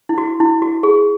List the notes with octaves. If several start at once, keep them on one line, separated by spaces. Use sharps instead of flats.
E4
F#4
E4
F#4
G#4